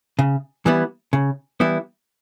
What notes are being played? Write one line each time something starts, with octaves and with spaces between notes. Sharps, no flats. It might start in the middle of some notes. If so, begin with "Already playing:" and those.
C#3
E3 G3 B3 E4
C#3
E3 G3 B3 E4